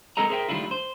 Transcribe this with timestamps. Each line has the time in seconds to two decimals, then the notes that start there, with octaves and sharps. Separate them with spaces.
0.17 G#3 C4 A4 A#4 D#5 A#5
0.29 G#4 A#4 C5 D5 E5 G5
0.48 D#3 G3 A3 D4 E4 F4
0.71 C5